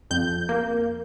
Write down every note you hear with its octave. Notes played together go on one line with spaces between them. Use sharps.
F2 G6
A#3